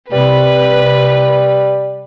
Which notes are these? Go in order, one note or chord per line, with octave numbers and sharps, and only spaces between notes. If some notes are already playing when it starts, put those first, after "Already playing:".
C3 G3 B4